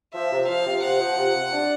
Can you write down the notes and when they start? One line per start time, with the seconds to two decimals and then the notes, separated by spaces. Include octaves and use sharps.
0.14 F3 E5
0.32 C3
0.49 F3 F5
0.67 C3
0.83 C3 F#5
1.00 F3
1.18 C3
1.35 C3
1.53 D4